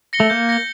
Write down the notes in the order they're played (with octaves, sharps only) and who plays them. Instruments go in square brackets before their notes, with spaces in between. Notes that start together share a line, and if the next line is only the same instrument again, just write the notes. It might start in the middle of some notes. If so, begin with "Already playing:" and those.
[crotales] A#6 C#7 G7
[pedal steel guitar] A3
[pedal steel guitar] A#3 [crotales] G6
[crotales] A#6 C#7 G7